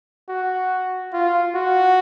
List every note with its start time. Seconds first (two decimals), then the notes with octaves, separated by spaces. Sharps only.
0.29 F#4
1.13 F4
1.55 F#4